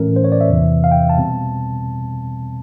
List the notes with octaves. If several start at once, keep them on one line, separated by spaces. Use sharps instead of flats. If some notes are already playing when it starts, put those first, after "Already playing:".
Already playing: A2 E3 A3 C#4 A#4
C5
C#5
D5
E5
E2 C3 E3
F5
G5
A5
B2 G3 C4